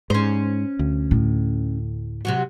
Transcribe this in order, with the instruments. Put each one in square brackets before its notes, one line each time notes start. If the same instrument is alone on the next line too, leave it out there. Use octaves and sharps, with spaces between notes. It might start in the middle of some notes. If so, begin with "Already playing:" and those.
[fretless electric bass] G#2 [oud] C#4 C5
[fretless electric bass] D2
[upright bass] A2
[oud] C3 F#3 F#4